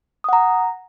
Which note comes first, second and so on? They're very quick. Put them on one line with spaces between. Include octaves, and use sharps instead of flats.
D#6 F#5 A#5